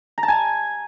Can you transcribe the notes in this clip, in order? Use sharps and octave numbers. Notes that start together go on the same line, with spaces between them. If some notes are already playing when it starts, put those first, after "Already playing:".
A#5
A5
G#5